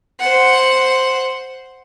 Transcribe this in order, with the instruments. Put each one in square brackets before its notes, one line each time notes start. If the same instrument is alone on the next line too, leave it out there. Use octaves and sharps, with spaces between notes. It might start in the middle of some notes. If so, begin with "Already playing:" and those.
[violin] C5 F#5